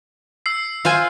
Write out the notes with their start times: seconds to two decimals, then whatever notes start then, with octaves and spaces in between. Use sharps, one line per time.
0.46 E6 C7
0.85 F4 C5 G#5